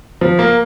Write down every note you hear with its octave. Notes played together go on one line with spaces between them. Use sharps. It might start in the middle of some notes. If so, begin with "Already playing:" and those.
F3
A#3